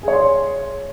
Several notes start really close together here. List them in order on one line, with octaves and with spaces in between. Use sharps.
G#4 C#5 C6